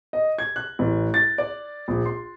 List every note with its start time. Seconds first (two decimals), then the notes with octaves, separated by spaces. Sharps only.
0.13 D#5
0.39 G#6
0.56 F#6
0.79 A1
1.14 A6
1.38 D5
1.88 A#1
2.06 C6